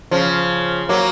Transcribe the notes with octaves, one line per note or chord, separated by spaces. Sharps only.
C#3 F3
F#3 A#3